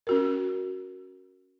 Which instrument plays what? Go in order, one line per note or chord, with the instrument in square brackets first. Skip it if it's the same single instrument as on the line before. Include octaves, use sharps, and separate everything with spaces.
[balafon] C#4 F#4 A#4